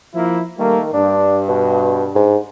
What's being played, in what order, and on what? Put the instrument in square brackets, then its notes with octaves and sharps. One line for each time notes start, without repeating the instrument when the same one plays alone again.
[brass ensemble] F3 A#3 E4
[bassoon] D#3 [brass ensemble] G3 A3 A#3
[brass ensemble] G2 [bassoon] D4
[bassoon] B2
G#2